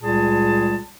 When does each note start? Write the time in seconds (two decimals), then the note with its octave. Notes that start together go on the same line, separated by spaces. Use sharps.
0.01 C#2 A#2 G3 G#4 A5